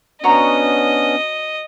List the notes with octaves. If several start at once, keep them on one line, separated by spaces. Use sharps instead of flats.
B3 C#4 D4 F#4 C#5 D#5 A#5